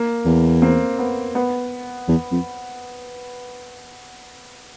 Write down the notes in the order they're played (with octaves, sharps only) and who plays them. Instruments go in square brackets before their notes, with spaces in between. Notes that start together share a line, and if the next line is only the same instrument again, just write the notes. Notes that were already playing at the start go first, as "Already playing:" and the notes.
Already playing: [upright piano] A#3
[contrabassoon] E2
[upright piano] A#3 C4
B3
B3
[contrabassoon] E2
F2